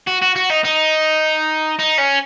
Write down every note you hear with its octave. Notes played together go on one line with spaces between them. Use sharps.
F#4
F#4
F#4
D#4
D#4
D#4
C#4